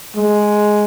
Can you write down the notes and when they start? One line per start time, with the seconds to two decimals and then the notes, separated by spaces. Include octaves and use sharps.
0.16 G#3